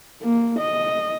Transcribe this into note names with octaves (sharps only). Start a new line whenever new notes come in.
A#3
D#5